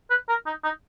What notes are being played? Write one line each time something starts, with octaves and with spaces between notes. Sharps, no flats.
B4
A#4
D#4
D#4